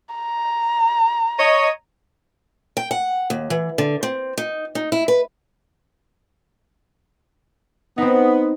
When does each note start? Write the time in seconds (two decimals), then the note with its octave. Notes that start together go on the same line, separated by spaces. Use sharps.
0.15 A#5
1.38 C#5 D#5
2.77 G5
2.91 F#5
3.30 D#2
3.50 E3
3.78 D3
4.03 C4
4.38 D#4
4.75 D#4
4.92 E4
5.08 B4
7.98 B3 C4 D#4